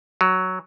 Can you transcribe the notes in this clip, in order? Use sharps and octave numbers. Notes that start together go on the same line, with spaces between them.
F#3